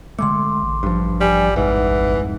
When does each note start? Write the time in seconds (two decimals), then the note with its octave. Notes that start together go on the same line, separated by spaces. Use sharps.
0.19 D3 G#3 A3 C6 D6
0.63 A1
0.83 G2 F3
1.21 G3 G#5
1.56 F1 C2 G#2 E3 F#5